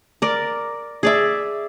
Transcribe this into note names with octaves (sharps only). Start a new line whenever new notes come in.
A#4 D5
G#4 D5 E5